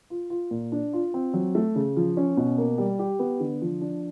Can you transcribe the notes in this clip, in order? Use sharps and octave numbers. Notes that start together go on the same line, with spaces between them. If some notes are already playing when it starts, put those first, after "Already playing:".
F4
F4
A#2
D4
F4
C4
F#3
A3
C#3
F3
C#4
B2
A#3
G3
G4
B3
D3
F3
D4